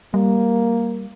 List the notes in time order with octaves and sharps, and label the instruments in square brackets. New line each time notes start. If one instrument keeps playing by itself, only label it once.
[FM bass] G3 [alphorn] A#3